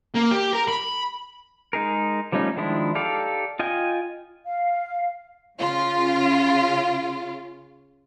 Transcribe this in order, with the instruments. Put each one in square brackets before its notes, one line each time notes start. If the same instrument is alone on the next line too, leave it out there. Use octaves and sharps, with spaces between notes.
[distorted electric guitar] A#3
G4
A#4
B5
[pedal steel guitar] G#3 D#4 G#4 A#4
F3 G3 A3 C#4 D#4
D#3 F3 G#3 D4 E4
D#4 G4 A4 D5 F5
F4 D#5 G5 G#5
[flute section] F5
[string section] C#3 F4